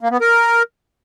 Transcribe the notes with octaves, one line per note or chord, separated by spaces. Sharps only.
A#3
B3
A#4